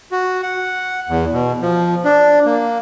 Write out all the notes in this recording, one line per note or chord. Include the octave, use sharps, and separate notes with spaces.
F#4
F#5
E2
B2
F3
D4
A#3